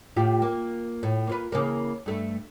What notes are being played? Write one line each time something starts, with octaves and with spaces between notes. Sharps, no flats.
A2 F4 G4
A#3
A2
A#3 F4 B4
C#3 E3 A#3
G2 A3